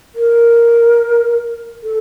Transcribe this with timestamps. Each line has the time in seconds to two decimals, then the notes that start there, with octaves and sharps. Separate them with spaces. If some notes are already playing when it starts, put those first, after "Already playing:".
0.15 A#4
1.83 A4